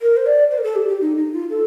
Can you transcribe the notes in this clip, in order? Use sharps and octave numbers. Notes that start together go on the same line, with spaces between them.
A#4
C5
D5
C5
A#4
A4
G4
G4
D#4
D#4
F4
A4